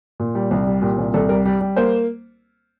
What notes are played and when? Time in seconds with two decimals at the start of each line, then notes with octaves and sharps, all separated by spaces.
0.20 A#2
0.35 G3
0.51 C2
0.67 G3
0.82 A#2 G4
0.98 C2
1.14 C2 A4
1.29 G3 A#4
1.46 G3 D5
1.61 G3
1.76 A#3 C5